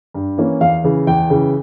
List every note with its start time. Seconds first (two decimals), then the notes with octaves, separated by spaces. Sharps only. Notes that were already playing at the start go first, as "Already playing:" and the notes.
0.14 G2
0.38 E3 A#3 C#4
0.61 E2 F5
0.84 C#3 E3
1.07 E2 G5
1.30 C#3 E3